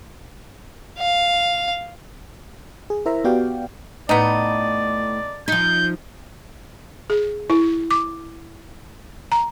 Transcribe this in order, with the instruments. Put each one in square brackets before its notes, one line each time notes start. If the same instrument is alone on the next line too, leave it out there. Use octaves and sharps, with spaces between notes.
[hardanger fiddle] F5
[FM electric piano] G#4
E4 A#4 C5 E5 A#5
B3 F#4 G4 D5 F5 G5
[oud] A2 [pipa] B3 D#4 [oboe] D5
[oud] F3 D#4 [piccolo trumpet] G6
[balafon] G#4
E4
D6
A#5